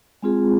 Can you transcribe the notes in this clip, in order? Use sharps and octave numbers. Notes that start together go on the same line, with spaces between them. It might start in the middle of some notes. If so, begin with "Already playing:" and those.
G#3 C4 F4 G#4